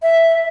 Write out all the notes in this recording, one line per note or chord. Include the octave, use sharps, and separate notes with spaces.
E5